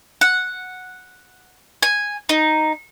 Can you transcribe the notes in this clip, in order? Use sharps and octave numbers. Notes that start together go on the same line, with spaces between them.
F#5
G#5
D#4